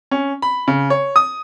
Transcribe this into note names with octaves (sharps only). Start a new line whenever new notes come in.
C#4
B5
C#3
C#5
D#6